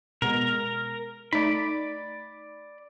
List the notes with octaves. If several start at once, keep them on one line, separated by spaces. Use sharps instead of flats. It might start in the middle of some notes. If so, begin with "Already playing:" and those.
B2 G#3 B3 A#4
A3 D#4 D5 B5